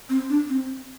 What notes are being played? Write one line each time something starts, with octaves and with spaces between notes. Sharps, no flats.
C4
D4
C4